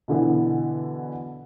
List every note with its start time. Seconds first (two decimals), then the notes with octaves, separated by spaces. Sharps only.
0.08 B2 D3 E3